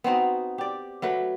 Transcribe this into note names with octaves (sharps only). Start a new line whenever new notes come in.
B3 C4 D#4 F#4
G4 D5
F#3 A3 B4